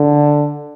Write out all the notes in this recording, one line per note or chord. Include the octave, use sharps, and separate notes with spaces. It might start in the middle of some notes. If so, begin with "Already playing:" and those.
Already playing: D3